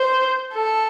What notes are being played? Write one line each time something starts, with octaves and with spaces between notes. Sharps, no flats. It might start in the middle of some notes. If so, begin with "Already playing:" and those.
Already playing: C5
A4